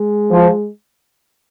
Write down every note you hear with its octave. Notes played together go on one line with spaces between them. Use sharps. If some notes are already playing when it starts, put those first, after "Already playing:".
Already playing: G#3
F3